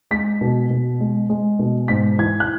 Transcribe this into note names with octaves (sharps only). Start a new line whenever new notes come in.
G#3 B6
B2
B2
G#3
G#3
B2
G#2 B6
E3 G#6
F#6